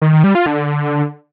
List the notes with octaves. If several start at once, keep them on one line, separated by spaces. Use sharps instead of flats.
D#3
D#3
G3
F4
D3